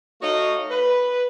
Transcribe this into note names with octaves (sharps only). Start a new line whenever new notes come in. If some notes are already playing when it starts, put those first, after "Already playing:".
A3 D#4 F#4 C#5 D#5 F5
B4